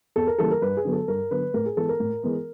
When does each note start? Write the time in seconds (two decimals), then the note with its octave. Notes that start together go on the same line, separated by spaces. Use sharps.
0.16 E2 A4
0.27 A#4
0.39 C#3 E3 G3 A#3 A4
0.51 A#4
0.62 G2 B4
0.77 G#4
0.85 D3 F#3 B3
0.93 A4
1.08 G2 A#4
1.31 D3 F#3 B3 B4
1.54 A2 A#4
1.66 G#4
1.77 E3 G#3 B3 A4
1.89 A#4
2.00 A2
2.23 E3 G#3 B3